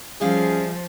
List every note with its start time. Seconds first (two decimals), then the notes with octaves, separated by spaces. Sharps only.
0.21 F3 G3 C#4 G#4 E5 F5